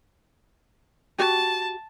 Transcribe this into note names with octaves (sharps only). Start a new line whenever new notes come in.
F#4 G4 A5